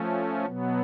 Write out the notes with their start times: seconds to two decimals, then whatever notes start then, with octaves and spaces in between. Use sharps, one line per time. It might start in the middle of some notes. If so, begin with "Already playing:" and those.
Already playing: F3 A3 C#4
0.45 B2 F#3 B3